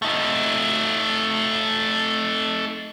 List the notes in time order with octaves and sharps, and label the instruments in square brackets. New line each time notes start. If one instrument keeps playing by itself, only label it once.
[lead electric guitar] A3 D#4